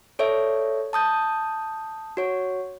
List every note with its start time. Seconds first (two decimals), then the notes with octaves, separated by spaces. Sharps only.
0.19 A4 C#5 D5 E5
0.93 A5 D#6 G6
2.17 F#4 C#5